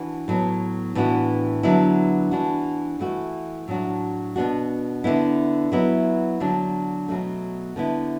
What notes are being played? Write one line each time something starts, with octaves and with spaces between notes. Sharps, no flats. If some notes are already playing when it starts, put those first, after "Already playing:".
Already playing: E3 D4 F#4
A2 F#3 B3
A2 E3 B3 D4 F#4
D3 F#3 B3 E4
E3 D4 F#4
E3 A3 F#4
A2 F#3 D4 F#4
B2 B3 D4 F#4
D3 B3 E4
F#3 B3 E4
D3 F#3 D4
B2 F#3 A3
D3 B3 E4